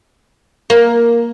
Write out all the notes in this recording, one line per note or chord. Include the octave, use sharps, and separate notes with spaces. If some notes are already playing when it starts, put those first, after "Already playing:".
A#3